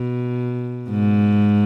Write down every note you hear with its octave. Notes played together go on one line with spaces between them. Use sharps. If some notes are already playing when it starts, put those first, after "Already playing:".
Already playing: B2
G#2